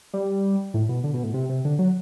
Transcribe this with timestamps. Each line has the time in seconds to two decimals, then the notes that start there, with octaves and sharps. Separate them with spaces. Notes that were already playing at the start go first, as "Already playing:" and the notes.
0.13 G3
0.74 A2
0.89 B2
1.04 D3
1.14 B2
1.24 A2
1.34 C3
1.49 C3
1.65 D3
1.79 F#3